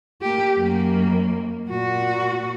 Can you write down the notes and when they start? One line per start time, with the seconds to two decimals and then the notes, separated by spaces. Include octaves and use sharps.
0.21 A#3 G4
0.58 F#2 A#3
1.69 A#2 F#4